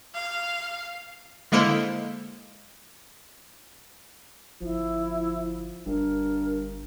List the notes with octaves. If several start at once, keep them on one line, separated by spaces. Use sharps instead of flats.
F5
D3 G#3 A#3 E4 A4 C5
G1 F3 E4
G1 G2 A#4